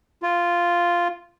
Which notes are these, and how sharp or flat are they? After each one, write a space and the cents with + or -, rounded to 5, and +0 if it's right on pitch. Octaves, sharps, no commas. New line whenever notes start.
F4 -5